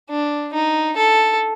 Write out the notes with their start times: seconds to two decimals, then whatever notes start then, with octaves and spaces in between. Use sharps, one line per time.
0.10 D4
0.54 D#4
0.97 A4